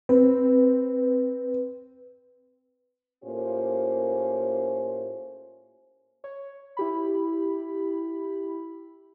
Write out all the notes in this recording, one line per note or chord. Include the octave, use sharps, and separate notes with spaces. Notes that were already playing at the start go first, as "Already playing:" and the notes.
C4 B4
A2 A#3 C#4 F4 G4 C5
C#5
E4 G4 B5